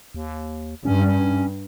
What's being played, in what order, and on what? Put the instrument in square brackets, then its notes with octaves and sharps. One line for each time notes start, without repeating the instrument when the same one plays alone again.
[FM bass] D#2
[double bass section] G2 [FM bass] C#4